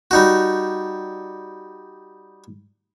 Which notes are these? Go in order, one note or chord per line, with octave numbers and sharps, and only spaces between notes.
G3 D#4 F#4